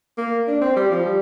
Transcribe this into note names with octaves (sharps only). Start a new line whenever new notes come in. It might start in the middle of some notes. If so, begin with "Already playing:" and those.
A#3
D4
C4
G3
F3
G3